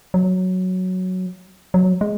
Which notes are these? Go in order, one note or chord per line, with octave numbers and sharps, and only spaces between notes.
F#3
F#3
G#3